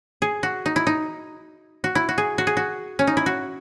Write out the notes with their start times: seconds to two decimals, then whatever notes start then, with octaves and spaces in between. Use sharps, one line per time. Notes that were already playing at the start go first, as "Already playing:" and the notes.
0.22 G#4
0.43 F#4
0.66 D#4
0.76 E4
0.87 D#4
1.84 F#4
1.95 E4
2.09 F#4
2.18 G#4
2.38 F#4
2.47 G#4
2.57 F#4
2.99 C#4
3.07 D#4
3.17 E4
3.26 F#4